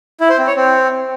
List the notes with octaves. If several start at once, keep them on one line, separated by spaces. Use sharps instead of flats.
E4
C5
C4
C#5
C4